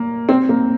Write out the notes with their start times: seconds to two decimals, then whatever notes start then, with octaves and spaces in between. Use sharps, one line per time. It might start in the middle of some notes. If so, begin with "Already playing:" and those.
Already playing: A#3
0.29 C4
0.49 A#3